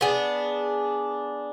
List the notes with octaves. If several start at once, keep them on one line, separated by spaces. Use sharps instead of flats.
B3 D4 G#4